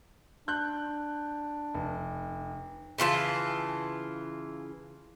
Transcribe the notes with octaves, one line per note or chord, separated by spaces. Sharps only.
D4 F#6 G6
F1
C#3 E3 F4 A5